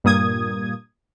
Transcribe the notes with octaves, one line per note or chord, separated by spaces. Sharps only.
G2 A#2 A#3 D#6 G#6